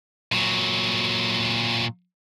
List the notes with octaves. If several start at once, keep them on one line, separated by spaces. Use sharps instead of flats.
A#2 F#3